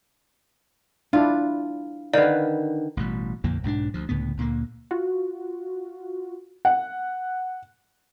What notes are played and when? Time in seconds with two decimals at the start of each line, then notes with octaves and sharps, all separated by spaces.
1.13 D4 E4 F4
2.14 D3 D#3 B4 D5 F5
2.97 A1 G2 B2 G3
3.44 A#1 F2 D3 A#3
3.63 B1 G#2 C#4 D4
3.94 D2 F3
4.09 C#2 A2 D3 B3
4.37 D2 A#2 D3 A#3
4.91 F4 F#4
6.65 F#5